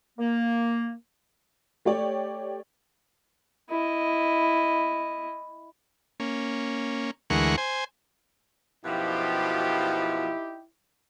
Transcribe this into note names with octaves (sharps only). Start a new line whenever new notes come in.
A#3
A3 G4 C#5 D5
E4 D#5
A#3 C#4
D2 E3 G#3 A#4 F#5 C#6
C5 G#5
F#2 B2 F3 D#4 E4 G4